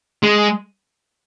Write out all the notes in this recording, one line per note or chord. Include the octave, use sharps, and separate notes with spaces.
G#3